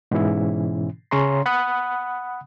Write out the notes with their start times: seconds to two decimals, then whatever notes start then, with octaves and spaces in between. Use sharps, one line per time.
0.11 G#2 B2 E3 C#4 E4
1.11 C#3 C#4 C#5 A#5 C6
1.46 F#5 B5 D#6 F#6